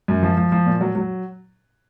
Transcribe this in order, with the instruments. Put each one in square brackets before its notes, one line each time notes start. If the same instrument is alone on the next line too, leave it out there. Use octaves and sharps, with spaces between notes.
[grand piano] F#2
F3
F3
F3
A#2
F#3
F#3